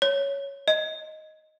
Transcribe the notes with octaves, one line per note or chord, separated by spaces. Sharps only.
C#5
D#5